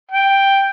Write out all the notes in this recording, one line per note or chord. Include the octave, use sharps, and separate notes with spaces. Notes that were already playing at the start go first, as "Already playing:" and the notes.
G5